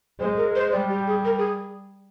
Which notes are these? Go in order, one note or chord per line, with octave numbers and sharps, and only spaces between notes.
G#3 C5
A#4
C5
G3 D5
G4
G#4
A#4
G#4